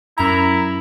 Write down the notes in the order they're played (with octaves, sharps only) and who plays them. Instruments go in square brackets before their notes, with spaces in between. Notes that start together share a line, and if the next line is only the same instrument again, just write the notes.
[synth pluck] F#2 A#5 [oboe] E4